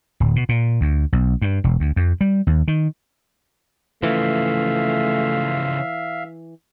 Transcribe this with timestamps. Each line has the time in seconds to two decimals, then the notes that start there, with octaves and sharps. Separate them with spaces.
0.20 D1
0.36 B2
0.49 A#2
0.81 D2
1.12 B1
1.42 G2
1.64 E1
1.80 D2
1.96 F2
2.21 G3
2.47 D#2
2.68 D#3
4.03 C#3 E3 F3 A3 E5 F5